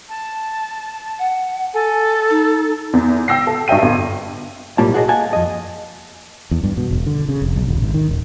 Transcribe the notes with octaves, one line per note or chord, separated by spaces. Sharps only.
A5
F#5
A4 G#5
D#4
E2
G5 E6 A#6 C7
A4
G2 D#5 E5 G5 D#7
G1
B1 A2 G3 A#3 F4 A5
F#4 G#4 D5 D#5
D#5 F5 F#5 G#5 A5
F2 D#5
E2
G2
B2
E1
D3
C#3
F1
B1
D#1
G#1
D#3
D#1